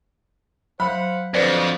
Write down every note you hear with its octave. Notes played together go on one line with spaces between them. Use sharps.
F#3 C5 F5 F#5 B5
F2 D3 F#4 B4 C5 D5